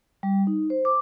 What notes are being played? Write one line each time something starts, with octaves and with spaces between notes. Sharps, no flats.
G3
D#4
C5
D6